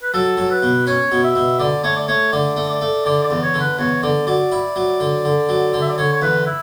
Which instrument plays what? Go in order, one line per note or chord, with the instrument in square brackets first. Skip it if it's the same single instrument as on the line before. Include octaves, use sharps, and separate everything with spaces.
[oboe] B4
[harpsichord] F#3 [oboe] A4
[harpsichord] F#3
[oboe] B4
[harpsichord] B2
[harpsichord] C#4 [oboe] C#5
[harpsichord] B2
[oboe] E5
[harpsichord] B2
[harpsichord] D3 [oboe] D5
[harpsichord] A3 [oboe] C#5
[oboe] D5
[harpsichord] A3 [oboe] C#5
[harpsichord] D3 [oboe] D5
[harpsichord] A3
[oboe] D5
[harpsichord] A3
[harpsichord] D3 [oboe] D5
[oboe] D5
[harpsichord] E2
[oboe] C#5
[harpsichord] D3
[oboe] B4
[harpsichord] E2 [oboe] C#5
[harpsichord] D3 [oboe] D5
[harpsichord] F#3 [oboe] D5
[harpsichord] E4
F#3
D3
D3
F#3
D3
[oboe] E5
D5
[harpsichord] D3 [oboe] C#5
[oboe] C#5
[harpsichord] E2 [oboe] B4
[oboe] E4